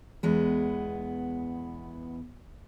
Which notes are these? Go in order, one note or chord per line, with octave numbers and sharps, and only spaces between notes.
E2 G#3 B3